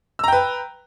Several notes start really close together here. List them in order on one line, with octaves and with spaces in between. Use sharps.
E6 A#5 G5 B4